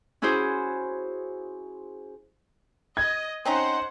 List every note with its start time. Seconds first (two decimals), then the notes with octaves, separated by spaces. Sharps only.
0.22 C#4 E4 F#4 G#4 C5
2.97 D#5 G#6
3.45 C4 C#4 D#4 C5 F#5